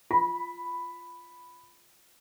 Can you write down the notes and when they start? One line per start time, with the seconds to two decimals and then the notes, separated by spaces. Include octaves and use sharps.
0.11 F4 B5